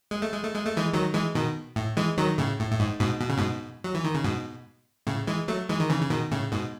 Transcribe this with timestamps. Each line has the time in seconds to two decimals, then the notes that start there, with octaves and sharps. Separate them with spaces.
0.11 G#3
0.22 A3
0.33 G#3
0.44 A3
0.55 G#3
0.66 A3
0.77 E3 G#3
0.93 D#3 F#3
1.14 E3 G#3
1.34 B2 D#3
1.76 A2
1.97 E3 G#3
2.18 D#3 F#3
2.38 A2 C#3
2.60 A2
2.72 A2
2.80 G#2
3.00 G#2 B2
3.21 B2
3.29 C#3
3.38 G#2 B2
3.84 F#3
3.94 E3
4.04 D#3
4.14 C#3
4.24 G#2 B2
5.07 A2 C#3
5.27 E3 G#3
5.48 F#3 A3
5.69 E3 G#3
5.80 D#3
5.90 C#3 E3
6.01 C#3
6.10 B2 D#3
6.31 A2 C#3
6.52 G#2 B2